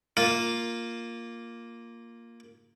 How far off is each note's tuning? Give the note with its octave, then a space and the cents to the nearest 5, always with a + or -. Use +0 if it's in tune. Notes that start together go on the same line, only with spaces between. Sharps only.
A#3 +0 F4 +0 F5 +0